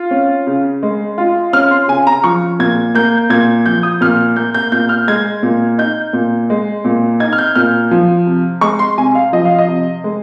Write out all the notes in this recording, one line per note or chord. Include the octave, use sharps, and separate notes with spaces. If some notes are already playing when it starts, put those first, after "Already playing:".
Already playing: F4
C#4
C#3
G#3
F4
C#4 F6
C6
C#3 G#5
A#5
F3 C#6
A#2 G#6
A#3 G6
A#2 G#6
F3 G6
D#6
A#2 F6
A#3 G6
G6
A#2 G6
F6
G#3 G#6
A#2
D#4 G6
A#2
G#3
A#2
D#4 G#6
F6
G6
A#2 F6
F3
C3
G#3 C#6
C6
C3 G#5
F5
F3 D#5
F5
D#5
C3
G#3